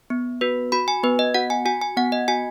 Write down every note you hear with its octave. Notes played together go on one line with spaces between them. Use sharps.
B3
F#4 B4
F#4 B5
G#5
B3 B4
D#5
F#4 F#5
G#5
F#4 G#5
G#5
B3 F#5
D#5
F#4 G#5